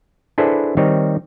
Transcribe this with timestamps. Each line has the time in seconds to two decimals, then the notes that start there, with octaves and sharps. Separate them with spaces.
0.38 D4 E4 G#4 A4 B4 C5
0.77 D#3 G3 C4 D#4 C#5